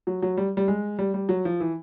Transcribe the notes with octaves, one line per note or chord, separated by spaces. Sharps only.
F#3
F#3
G3
G3
G#3
G3
G3
F#3
F3
E3